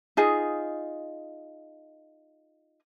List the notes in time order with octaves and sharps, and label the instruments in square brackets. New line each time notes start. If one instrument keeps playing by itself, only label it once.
[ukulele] D#4 F4 G#4 D#5